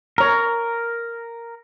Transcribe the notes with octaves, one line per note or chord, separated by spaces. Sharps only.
A#4 C#5 A#5